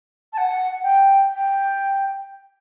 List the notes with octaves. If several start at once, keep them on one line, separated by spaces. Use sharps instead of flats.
A5
F#5
G5
G5